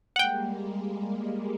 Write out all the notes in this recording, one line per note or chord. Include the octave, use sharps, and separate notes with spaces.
G3 G#3 A#3 F#5 G5